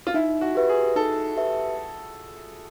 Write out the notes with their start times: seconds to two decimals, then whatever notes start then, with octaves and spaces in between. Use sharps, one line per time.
0.07 F4
0.14 D#4 E4
0.41 F#4
0.55 G4 B4 E5
0.69 G#4
0.96 D#4 A4
1.36 G4 B4 E5